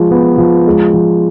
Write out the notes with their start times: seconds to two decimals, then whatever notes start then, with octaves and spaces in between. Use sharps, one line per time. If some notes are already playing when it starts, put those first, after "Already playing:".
Already playing: F3 G#3
0.11 B3
0.38 F3
0.67 G#3
0.94 F3